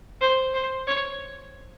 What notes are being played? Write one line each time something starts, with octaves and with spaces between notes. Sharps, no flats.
C5
C5
C#5